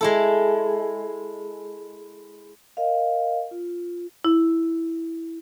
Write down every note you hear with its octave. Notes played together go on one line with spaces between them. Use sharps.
G#3 E4 A4
A#4 D#5 F5
F4
E4